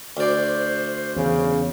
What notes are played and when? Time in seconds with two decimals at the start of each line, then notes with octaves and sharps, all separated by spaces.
0.17 D2 C5 D5
1.16 E2 C#3